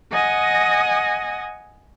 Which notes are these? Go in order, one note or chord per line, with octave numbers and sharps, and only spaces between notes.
D#5 F#5 G#5 D#6 A#6